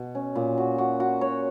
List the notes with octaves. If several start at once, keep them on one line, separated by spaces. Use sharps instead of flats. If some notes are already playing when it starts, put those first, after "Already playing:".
Already playing: B2
C#4
A#2
F#4
F#4
F#4
C#5